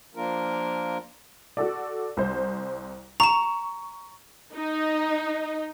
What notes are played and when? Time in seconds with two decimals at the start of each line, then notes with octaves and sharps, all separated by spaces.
0.15 F3 A#3 D4 F4 A#4
1.57 F#4 A4 D5
2.17 C2 C5
3.20 A#5 C#6 E7
4.54 D#4